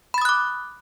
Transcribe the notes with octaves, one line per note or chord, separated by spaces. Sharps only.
B5 D6 D#6 F#6 A6